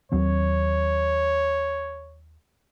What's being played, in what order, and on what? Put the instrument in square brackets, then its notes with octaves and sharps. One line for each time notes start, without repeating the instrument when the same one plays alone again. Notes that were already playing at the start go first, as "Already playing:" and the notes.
[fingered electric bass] D#2 F#3 C4 [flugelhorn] C#5